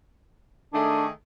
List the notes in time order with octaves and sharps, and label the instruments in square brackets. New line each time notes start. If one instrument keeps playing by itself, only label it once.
[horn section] D#3 A3 G#4 [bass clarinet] D4